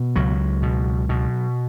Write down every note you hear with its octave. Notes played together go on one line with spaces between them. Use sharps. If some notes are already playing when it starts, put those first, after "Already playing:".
Already playing: B2
C#2 F#3
B2
B2